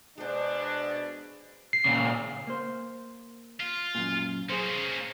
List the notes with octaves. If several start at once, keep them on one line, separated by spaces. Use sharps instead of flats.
B2 G#3 D4 C5
C7
A#2 C#3
A#3 C5
F4
F#2 A#2
A#3 C#4 G#4 C5